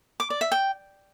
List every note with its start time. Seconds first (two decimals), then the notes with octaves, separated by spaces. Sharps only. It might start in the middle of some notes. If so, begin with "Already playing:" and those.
0.20 D6
0.30 D5
0.41 E5
0.52 G5